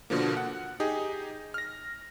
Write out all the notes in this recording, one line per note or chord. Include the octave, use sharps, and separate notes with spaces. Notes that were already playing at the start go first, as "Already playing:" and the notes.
B2 D3 F3 A#3
F#5
D#4 G4 G#4 D#5
F6 A#6